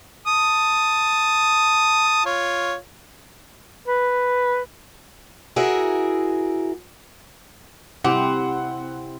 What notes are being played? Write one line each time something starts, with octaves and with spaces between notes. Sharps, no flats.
A5 D#6
F4 C#5
B4
E4 F#4 G#4 A#4 E5
C3 C4 E4 G4 F#5